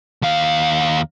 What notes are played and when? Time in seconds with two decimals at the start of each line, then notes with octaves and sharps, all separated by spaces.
0.22 D#2 F5